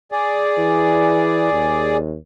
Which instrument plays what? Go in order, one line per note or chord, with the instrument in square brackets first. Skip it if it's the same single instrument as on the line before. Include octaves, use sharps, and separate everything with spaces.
[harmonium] G#4 D5
[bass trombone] E3
D#2